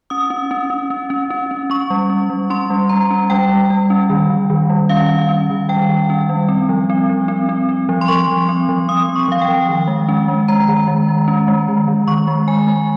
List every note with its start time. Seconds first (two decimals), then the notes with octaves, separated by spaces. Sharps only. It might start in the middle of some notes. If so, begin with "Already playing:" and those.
0.10 C#4 D#6
0.30 C#4
0.51 C#4
0.70 C#4
0.90 C#4
1.10 C#4
1.30 C#4
1.51 C#4
1.70 C#4 C#6
1.90 G3
2.10 C#4
2.30 G3
2.50 C#4 C6
2.70 G3
2.89 G3 A#5
3.11 C#4
3.30 G3 G5
3.49 G3
3.70 G3
3.90 C#4
4.10 D#3
4.30 D#3
4.50 D#3
4.70 G3
4.89 C#4 F5
5.09 C#4
5.29 C#4
5.50 D#3
5.69 G3 G5
5.89 D#3
6.10 C#4
6.29 G3
6.49 C4
6.69 F3
6.90 C4
7.09 F3
7.28 C4
7.49 C4
7.69 C4
7.89 F3
8.01 C6
8.08 F3 C#6
8.28 F3
8.49 C4
8.69 F3
8.88 C4 D#6
9.09 C4
9.16 C#6
9.28 F3 F5
9.42 G5
9.48 F3
9.68 D#3
9.88 G#3
10.09 C#4
10.28 G#3
10.48 G#3 A#5
10.69 D#3
10.88 G#3
11.08 G#3
11.28 C#4
11.48 G#3
11.68 D#3
11.88 D#3
12.08 D#3 C#6
12.28 G#3
12.47 G#3 G#5
12.67 G#3